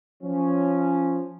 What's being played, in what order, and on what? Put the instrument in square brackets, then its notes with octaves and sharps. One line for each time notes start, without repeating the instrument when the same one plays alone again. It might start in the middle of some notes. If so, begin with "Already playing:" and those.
[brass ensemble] F3 C#4